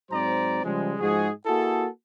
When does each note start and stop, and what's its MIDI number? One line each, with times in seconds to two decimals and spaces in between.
0.10 0.61 44
0.10 0.61 54
0.10 0.61 60
0.10 0.61 72
0.10 0.61 74
0.10 0.61 82
0.63 0.94 49
0.63 0.94 53
0.63 0.94 55
0.63 0.94 56
1.00 1.29 44
1.00 1.29 53
1.00 1.29 56
1.00 1.29 66
1.00 1.29 68
1.46 1.86 58
1.46 1.86 64
1.46 1.86 66
1.46 1.86 68
1.46 1.86 69